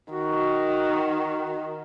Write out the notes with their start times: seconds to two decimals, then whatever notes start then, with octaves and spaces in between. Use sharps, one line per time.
0.13 D#3 F#4